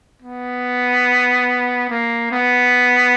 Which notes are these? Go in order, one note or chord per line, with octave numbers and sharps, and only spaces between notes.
B3
A#3
B3